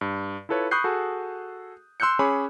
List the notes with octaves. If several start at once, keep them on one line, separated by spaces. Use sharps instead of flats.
G2
E4 F4 A4 B4 C#5
B5 C#6 D#6 F#6 G6 C7
F#4 G#4 A4
C6 E6 F#6 G6 C#7
C#4 G#4 C#5 B5 D6